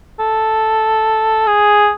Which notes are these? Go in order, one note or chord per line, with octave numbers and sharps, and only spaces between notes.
A4
G#4